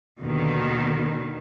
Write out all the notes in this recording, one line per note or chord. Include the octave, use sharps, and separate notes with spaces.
D#2 B2 D3 D#3